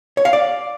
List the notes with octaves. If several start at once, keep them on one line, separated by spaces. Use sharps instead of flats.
C#5
F5
D5